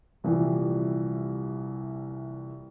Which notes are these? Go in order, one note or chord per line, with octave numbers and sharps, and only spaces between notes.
C2 A#2 E3 F3 G3